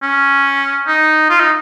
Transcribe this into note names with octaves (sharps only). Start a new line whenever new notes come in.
C#4
D#4
F4
D#4